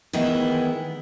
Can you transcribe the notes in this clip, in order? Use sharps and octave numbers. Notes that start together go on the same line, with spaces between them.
D#3 E3 G#3 B3 E4